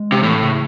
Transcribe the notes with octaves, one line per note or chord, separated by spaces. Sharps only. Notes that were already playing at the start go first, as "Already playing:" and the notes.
Already playing: G#3
C3
A2 E3
C#3